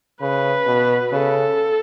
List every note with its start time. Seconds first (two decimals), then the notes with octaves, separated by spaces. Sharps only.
0.21 C#3 B4
0.67 B2
1.12 C#3 A4